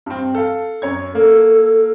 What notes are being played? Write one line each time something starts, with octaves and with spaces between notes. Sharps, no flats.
G2 C4
A4 F5
F#2 C#5 G#6
A#3 A4